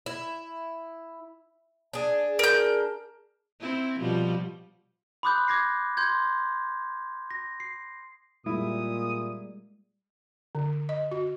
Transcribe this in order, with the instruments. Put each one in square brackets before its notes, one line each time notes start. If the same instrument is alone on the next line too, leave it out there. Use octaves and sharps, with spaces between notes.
[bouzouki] E4
D4 G#4
[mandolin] A#4 G6
[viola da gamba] C4 E4
B2 F3 G3
[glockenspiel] B5 C6 D6 D#6 F#6 G6
D6 G#6 A#6 C7
C6 G6 G#6
A#6
C7
[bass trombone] A#2 [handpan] G3 G#3 [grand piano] E4 [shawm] D#6
[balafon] D3
D#5
F#4